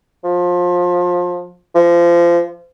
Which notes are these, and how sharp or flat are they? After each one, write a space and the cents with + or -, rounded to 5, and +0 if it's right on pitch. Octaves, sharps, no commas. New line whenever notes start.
F3 +25
F3 -25